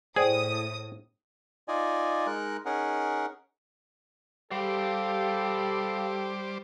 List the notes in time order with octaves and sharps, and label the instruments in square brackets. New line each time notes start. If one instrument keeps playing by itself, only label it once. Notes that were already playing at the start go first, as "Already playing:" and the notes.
[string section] A2 D#6 [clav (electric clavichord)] G#4 [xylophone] C5 D5 G5
[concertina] D#4 F4 D5 D#5 G#5
G#3 D#4 A#4 F#6
C#4 D#4 G#4 A#4 F#5
[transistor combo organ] G3 C5 D6 [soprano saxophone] G4 [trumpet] A4 [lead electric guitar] F5 B5